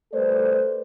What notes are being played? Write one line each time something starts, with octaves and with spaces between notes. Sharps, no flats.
G3 A3 A4 B4 C5 D5